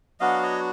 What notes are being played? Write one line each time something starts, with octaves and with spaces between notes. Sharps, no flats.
F#3 B3 D4 F#4 D#5 F5
C#5 D#5